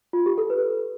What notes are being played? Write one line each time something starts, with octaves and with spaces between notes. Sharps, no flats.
F4
G4
A4
B4